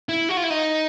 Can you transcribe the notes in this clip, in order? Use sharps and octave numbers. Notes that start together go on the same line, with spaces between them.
E4
F#4
F4
E4
D#4